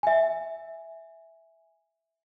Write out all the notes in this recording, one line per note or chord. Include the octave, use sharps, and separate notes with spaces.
E5 G#5